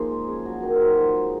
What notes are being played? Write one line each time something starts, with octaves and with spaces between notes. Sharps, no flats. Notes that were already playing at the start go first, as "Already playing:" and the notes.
Already playing: F3 A#3 D#4 G#4 A#4 C5
G#3
C#3
F#3
D#3 A#4
C5
F#3 A#4
F3 C5
G#3